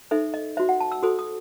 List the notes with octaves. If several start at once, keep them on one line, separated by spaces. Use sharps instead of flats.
D#4 A4 C5 E5
D#5
F#4 C5 E5
F#5
A5
E6
F#4 A4 C5 D#6
D#6